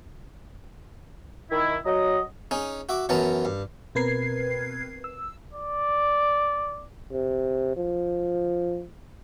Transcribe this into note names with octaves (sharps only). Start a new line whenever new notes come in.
D#3 E4
F#3 D#5
C#4 D#4 G#4
F#4 E5 D6
F#2 E3 B3 C#4 A5 A#5
G2
B2 C4 A#4 B4 G#6 C7
E6
D5
C3
F3